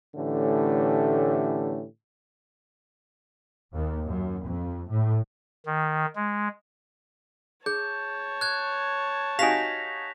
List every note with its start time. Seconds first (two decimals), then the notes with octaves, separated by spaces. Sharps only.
0.15 A2 D3 E3 A3 C#4 G4
3.74 D#2
4.07 F#2
4.46 F2
4.91 A2
5.66 D#3
6.16 G#3
7.66 G#4 C#5 A5 G6
8.41 F#6 G#6
9.39 D#4 F#4 G4 F5 G#5 A#6 B6 F7